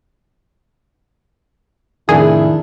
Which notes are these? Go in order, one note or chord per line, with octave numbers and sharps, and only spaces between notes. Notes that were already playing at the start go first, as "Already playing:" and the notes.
F2 A2 C3 D#3 D4 E4 G#4